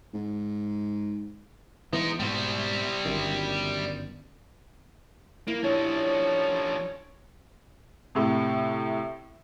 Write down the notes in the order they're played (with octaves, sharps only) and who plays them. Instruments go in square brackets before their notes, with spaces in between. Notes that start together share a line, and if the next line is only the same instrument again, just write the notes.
[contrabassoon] G#2
[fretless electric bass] E3 B3 [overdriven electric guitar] G#3 D#4
[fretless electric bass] G#2 B2 [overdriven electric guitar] G3 C5
[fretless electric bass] G1 F#2 D#3
[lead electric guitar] A#3 [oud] E4
[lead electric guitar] F3 D4 [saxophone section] G3 C#4 C#5
[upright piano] A2 C3